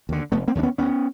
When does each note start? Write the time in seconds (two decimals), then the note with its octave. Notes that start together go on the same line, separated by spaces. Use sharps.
0.09 D#2 D3
0.32 F1 A3 B3
0.48 A#3 C4
0.55 D#2 D3 D4
0.63 B3 C#4
0.78 D2 B3 C#4